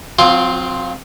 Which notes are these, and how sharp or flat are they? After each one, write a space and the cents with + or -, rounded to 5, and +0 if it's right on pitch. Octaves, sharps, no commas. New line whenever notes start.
F#3 -35 C4 +0 F4 +0